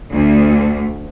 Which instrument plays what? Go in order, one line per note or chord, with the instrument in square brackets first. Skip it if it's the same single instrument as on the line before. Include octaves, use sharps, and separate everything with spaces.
[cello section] D2